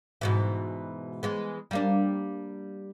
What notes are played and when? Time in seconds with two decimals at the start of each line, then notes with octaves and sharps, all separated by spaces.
0.21 G#2 B2 E3
1.23 E3 G#3 B3
1.71 G3 A#3 D4